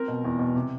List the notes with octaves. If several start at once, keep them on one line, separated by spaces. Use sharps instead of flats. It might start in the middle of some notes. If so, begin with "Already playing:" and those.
Already playing: C4 A#4
B2
E2
B2
C3